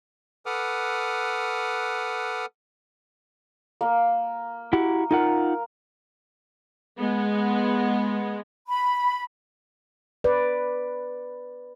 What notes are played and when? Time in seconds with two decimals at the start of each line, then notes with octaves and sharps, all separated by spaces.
0.46 A4 B4 F#5 D6 D#6 F6
3.81 A#3
4.73 E4 F#4 G4
5.11 D#4 F4 A#4 F#5
6.97 G#3 B3
8.67 B5
10.24 B4 D5